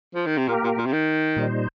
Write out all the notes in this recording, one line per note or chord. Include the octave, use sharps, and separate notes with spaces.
F3
D#3
C3
A#2 A#3 G4 A#4
A#2
A#2
C3
D#3
A#2 G3 D#4 C5